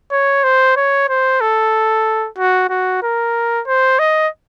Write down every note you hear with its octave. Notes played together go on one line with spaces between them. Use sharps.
C#5
C5
C#5
C5
A4
F#4
F#4
A#4
C5
D#5